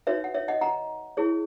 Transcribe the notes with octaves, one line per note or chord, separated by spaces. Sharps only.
D#4 F#4 B4 C#5 E5
F#5
C#5 E5
D#5 F#5
F#5 A#5
E4 G#4 C#5